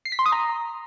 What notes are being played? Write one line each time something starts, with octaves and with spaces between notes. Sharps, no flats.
C7
B6
C6
D#6
A#5